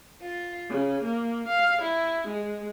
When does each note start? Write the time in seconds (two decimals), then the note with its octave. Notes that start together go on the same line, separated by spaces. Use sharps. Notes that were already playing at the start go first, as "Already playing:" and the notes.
0.21 F4
0.68 C#3
1.02 A#3
1.47 F5
1.82 E4
2.26 G#3